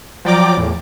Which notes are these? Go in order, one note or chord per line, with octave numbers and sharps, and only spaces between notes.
F3 F#3 D5 G5 A#5 D6
E2 A2